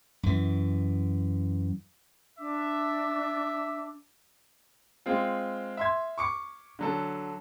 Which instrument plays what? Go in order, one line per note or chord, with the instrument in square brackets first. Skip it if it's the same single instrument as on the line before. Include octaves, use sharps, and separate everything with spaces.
[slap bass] F#2 E3
[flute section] D4 D6 [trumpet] E5
[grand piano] G#3 C4 F4
E5 C6 G#6
C#6 D6 C#7
D3 F#3 A4